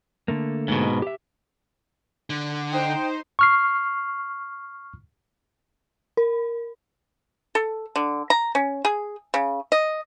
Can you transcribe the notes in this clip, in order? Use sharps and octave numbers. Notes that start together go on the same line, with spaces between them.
D3 A3 A#3
G#2 B2
G4 E5
D3
D#4 C5 G5
C#6 F6 C7
A#4
A4
D3
A#5
C#4
G#4
C#3
D#5